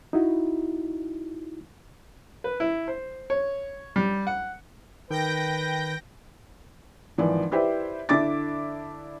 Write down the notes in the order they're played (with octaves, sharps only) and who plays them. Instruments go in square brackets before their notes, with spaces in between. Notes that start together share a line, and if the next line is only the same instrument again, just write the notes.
[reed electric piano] D#4 E4 F#4
[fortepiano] B4
E4
C5
C#5
G3
F#5
[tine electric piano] D#3 [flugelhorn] B4 [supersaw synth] G5 G6 A#6
[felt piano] G#1 E3 F3 D5
E4 G4 B4 C5 D5 E5
D3 D4 E4 E5 D6 A6